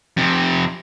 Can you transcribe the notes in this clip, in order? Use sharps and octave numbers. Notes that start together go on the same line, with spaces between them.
F2 C3